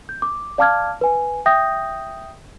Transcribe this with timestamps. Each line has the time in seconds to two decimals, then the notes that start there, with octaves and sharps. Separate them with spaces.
0.09 G6
0.22 D6
0.58 D5 F5 A5 D6 F6 G#6
1.01 B4 G#5
1.46 E5 G5 D#6 G6 A#6